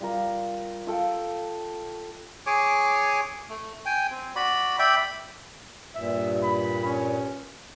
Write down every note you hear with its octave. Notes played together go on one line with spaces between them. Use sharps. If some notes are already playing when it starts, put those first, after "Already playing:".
G3 F4 A#4
F4 A4 G5
G#4 C#5 G#5 D6
A3
G5 G#5
C4
F#4 D5 B5
D5 E5 G5 B5
G2 A#2 E5
B5
C#4